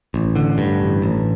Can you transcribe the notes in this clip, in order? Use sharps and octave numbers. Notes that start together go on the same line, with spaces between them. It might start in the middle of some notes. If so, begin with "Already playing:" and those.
A1
D3
G2
A1
A1